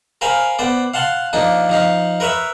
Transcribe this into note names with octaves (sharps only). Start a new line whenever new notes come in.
A#4 C5 F5 G#5 B5
B3 C5 D5
F5 F#5 A5 C6
F3 A#3 D4 D#4
F3 D#4 F5
A#4 B4 C#5 E5